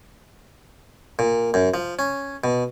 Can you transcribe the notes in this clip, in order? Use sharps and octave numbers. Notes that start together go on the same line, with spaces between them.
A#2
F#2
F3
C#4
B2